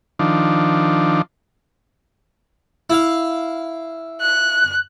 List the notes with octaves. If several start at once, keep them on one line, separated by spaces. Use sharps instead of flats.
D#3 F3 D4
E4 F5
F#6